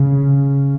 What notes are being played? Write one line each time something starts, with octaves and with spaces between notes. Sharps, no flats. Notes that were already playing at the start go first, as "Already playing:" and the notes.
Already playing: C#3